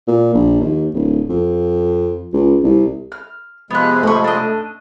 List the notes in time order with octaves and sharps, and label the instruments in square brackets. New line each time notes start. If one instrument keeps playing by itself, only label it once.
[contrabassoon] A#2
A#1
D#2
D1
F2
C#2
C2
[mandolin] F6
[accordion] C3 F3 G#3 [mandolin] B3 F#6
[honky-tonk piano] A3 [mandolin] B5 C#6
[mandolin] D4 D#5